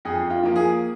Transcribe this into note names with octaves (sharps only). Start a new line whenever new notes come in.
F2 G#4
F4
F3 A#3
G#4